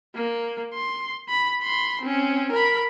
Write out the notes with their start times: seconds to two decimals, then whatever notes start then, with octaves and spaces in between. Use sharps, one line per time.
0.15 A#3
0.74 C6
1.29 B5
1.62 B5 C6
2.01 C4 C#4
2.52 A#4 B5